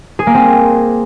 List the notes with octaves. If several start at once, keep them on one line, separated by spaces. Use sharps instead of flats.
G#4
A#3
C4